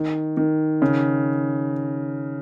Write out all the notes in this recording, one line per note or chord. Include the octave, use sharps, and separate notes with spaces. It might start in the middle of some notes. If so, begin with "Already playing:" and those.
Already playing: D#3
D#3
C#3